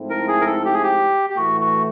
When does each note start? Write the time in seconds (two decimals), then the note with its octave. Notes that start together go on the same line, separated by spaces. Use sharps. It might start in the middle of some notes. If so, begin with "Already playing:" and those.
Already playing: G#2 F3 A3 C4 E4
0.10 A#4
0.28 G#4
0.41 A#4
0.46 A4
0.65 G4
0.73 G#4
0.83 G4
1.30 G4
1.37 A2 E3 A3 F#4
1.61 F#4